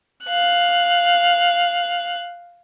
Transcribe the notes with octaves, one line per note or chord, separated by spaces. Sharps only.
F5 F#6